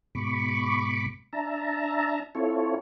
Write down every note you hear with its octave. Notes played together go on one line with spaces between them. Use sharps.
G#2 B2 B5 C#6 D6
D4 E5 A5 A#5
C4 E4 F4 A4 C#5